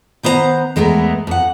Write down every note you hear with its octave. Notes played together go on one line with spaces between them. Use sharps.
D#3 B3 C5 E5 A#5
E2 G#3 A3 B3 A#4
F2 F#5